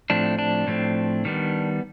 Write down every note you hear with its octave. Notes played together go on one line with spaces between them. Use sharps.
A2 F3 A3 C4 D4
D4
A2 F3 A3 C4
D#3 G3 B3